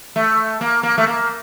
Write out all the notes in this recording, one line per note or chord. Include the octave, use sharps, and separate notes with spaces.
A3
A#3
A#3
A3
A#3